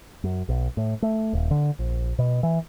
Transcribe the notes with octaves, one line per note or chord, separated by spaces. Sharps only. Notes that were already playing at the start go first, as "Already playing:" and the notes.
F#2
B1
A2
A3
D#1
D3
A#1
B2
E3